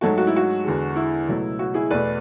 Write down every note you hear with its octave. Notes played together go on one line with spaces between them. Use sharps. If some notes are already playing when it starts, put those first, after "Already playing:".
G#2 F#3 A3 F#4 A4
F#4
E4
F#4
E2 D3 G#3
E4
C#2 B2 F#3 A3
F#4
E4 G#4
E2 B2 A3 B4 D5